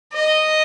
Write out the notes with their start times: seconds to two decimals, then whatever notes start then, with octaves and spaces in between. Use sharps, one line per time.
0.14 D#5